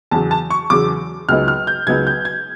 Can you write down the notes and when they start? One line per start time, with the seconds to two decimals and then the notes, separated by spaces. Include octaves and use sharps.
0.11 E2 C#3 F#3 A5
0.31 A5
0.50 C#6
0.70 E2 C#3 F#3 D6
1.29 C#2 C#3 F#3 B3 D#4 F6
1.48 F6
1.67 G6
1.87 C#2 C#3 F#3 B3 D#4 G#6
2.07 G6
2.25 G#6